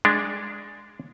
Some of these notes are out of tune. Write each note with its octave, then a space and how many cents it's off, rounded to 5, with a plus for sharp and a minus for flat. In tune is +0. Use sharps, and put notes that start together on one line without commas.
G#3 +0 D4 +0